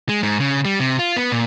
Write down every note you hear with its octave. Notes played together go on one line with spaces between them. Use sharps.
G#3
G#2
C#3
G3
C3
F4
B3
A#2